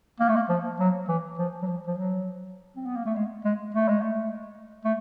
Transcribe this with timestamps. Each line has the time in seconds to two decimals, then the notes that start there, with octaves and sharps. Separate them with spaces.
0.20 A#3
0.29 A3
0.36 A#3
0.49 F3
0.80 F#3
1.08 E3
1.39 F3
1.62 F#3
1.68 F3
1.87 F3
1.97 F#3
2.76 C4
2.86 B3
2.96 A#3
3.06 A3
3.16 G#3
3.45 G#3
3.75 A3
3.89 G#3
4.02 A3
4.85 A3